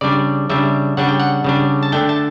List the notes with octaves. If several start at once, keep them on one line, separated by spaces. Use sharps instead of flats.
C#3 G3 D4 D5
C#3 G3 D4 E5
C#3 G3 D4 F#5
G5
F#5
C#3 G3 D4
A5
D3 A3 D4 G5
A5